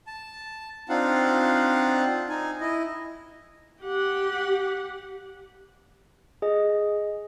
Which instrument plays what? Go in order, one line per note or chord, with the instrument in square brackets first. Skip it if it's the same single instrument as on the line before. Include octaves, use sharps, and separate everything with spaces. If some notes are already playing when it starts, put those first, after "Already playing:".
[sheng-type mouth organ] A5
C4 D4 D#4 F4 F5 F#5
D#4 G#5
E4 D#5
[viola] G4 F#5
[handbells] G#4 D#5